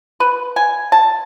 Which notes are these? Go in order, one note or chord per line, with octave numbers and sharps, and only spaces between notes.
B4
G#5
A5